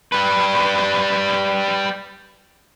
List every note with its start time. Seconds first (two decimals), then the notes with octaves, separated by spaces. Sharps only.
0.12 G3 B4